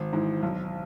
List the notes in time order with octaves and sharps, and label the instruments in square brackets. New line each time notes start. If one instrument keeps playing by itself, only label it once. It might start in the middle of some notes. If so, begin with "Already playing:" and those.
Already playing: [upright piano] G#1
G#2 E3
B1